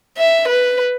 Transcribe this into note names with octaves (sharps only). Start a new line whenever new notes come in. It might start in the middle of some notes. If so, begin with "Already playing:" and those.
E5
B4